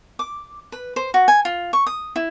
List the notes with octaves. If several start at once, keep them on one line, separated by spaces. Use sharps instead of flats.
D6
B4
C5
F#4
G#5
F4
C#6
D#6
E4